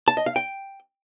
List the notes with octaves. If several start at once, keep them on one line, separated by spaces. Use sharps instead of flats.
A5
D#5
F5
G5